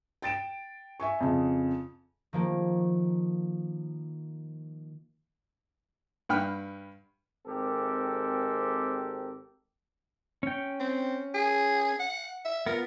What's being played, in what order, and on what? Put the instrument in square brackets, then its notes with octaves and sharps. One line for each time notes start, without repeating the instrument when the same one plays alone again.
[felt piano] G5 A6 D7 E7
E5 G#5 C#6
F2 C#3
[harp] D#3 F3 A#3
[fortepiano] G2 F#5 G5 B5 F6
[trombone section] G#1 G#3 C4 G4 A4 A#4
[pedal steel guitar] C#4 G5
[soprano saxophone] C4
G#4
F#5
E5
[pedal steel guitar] B3 F4 [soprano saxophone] A#4